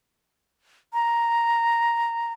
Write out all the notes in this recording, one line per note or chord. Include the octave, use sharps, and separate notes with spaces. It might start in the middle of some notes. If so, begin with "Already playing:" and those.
A#5